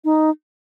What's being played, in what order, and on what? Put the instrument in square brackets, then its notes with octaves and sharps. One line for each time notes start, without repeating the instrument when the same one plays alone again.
[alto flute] D#4